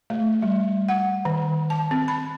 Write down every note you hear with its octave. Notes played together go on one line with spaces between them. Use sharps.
A3
G3
F#5
D#3
A5
C4
B5